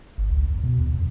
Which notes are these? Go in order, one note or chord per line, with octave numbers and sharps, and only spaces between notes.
G#1
C#2
E2
B2
D#2
F2